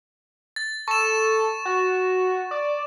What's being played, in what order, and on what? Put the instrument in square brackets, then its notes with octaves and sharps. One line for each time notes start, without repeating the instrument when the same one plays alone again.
[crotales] A6
[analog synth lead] A4 [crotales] C#6 E7
[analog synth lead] F#4
D5